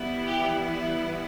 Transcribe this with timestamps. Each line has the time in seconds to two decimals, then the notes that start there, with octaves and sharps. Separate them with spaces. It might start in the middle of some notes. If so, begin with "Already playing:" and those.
Already playing: E3 G3 B3 E4
0.27 G4